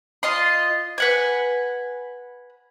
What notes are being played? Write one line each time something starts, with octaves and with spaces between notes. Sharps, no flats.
F4 D#5 C6
B4 F#5 G#5